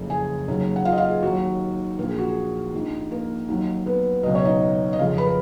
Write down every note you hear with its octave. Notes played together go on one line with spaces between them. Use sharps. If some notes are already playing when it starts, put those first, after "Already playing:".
Already playing: F#1 F2 C#3
G#4 G#5
D#2 C#3 F#3
F#5
F4 F5
D#5
F4 F5
G#4
D#2 D#3 F#3 F#4
A#1 A#2 F3 A#4
G#4
F#4
G#4
A#1 G#2 F3
A#3 A#4
D#2 D#3 F#3
B3 B4
C#2 B2 F#3 D#5
C#5
D#4 D#5
D#5
F2 C#3 F3 F4 F5
B4 B5
A#4